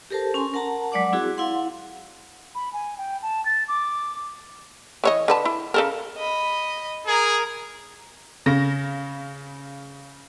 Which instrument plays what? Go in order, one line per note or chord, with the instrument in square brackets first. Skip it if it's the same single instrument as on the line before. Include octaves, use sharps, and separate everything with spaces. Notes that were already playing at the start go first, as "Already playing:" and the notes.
[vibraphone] G4 A4 A#4 C5 A5
C#4 G#5 C6
A#4 F#5 A5 A#5
F#3 G#3 D5 F#5 D6
C4 E4 F#4 G#4
E4 F5 F#5 C6
[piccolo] B5
G#5
G5
A5
A6
D6
[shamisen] E3 C#5 D#5
D3 B4 A5
E4
C#3 A4 A#4
[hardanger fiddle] D#5 B5
[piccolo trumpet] G#4 [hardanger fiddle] A#4 A#5
[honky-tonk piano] C#3 A#6